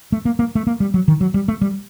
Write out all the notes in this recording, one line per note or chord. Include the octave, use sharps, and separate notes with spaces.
A3
A#3
A#3
A3
A#3
G3
F#3
D#3
F#3
G3
A3
G3